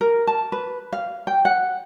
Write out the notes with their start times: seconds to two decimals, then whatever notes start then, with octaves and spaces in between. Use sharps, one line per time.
0.01 A#4
0.27 A5
0.52 B4
0.93 F5
1.27 G5
1.45 F#5